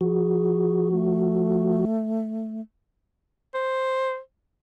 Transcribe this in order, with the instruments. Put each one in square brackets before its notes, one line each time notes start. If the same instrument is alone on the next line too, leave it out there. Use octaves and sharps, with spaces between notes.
[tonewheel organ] F3 F#4 [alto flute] G#4
[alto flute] A3
[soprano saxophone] C5